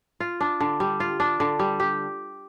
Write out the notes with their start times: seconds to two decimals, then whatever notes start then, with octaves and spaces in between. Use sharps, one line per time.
0.20 F4
0.41 D4
0.60 D3
0.80 G3
1.00 F4
1.20 D4
1.40 D3
1.59 G3
1.80 G4